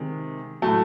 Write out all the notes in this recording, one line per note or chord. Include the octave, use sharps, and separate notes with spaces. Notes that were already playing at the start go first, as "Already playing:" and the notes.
Already playing: C3 D#3 G#3
A2 F#3 A3